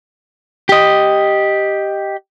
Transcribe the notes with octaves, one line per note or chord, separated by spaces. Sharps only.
G4 D#5